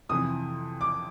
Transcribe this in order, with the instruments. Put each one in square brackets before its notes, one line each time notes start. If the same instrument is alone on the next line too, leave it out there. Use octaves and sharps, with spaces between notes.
[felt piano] F2 C3 E3 [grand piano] D#6
[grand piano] D6